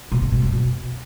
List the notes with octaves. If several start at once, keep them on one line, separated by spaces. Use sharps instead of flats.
B2
C3
B2
F#2
B2